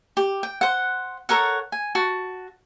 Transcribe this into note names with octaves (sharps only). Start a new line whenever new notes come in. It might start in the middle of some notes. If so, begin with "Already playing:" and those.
G4
G5
C5 F#5
A4 A#4 C#5 F#5
G#5
F#4 A5